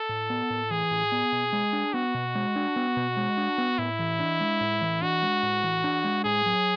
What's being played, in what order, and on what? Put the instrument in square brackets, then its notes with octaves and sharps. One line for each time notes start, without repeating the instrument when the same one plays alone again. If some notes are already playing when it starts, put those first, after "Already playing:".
Already playing: [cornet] A4
[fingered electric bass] A2
B3
A2
[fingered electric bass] E3 [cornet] G#4
[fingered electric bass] A2
B3
B2
G#3
D4
[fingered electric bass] B3 [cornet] F#4
[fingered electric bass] B2
G#3
D4
B3
B2
G#3
D4
B3
[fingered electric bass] A2 [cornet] E4
[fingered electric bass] E3
D4
G#3
A2
E3
[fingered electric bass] D4 [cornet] F#4
[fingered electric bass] G#3
A2
E3
D4
G#3
[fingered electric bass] A2 [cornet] G#4
[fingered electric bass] F#3